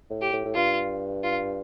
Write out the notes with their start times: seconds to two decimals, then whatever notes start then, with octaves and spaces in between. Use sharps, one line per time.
0.10 A2
0.21 G4
0.33 A2
0.45 A2
0.55 G2 F4
1.24 F4